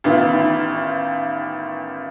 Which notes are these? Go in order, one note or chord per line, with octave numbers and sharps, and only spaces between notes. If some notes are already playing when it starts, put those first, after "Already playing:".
A1 D#3 B3 F4